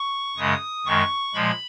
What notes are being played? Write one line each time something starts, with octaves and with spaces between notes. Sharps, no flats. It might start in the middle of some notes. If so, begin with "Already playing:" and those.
Already playing: C#6
F#2 C#3 G#3 D#6
F#2 D#3 G#3 C#6
A#2 F3 G#3 B5